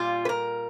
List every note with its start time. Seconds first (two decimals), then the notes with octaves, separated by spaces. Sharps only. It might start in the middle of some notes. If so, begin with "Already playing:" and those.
Already playing: A#2 G3 F4
0.25 B4
0.29 A#4